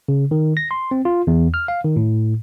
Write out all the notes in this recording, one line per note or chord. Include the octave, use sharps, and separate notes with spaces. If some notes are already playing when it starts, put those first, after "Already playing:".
C#3
D#3
A#6
C6
C4
F4
E2
F6
F5
D#3
A2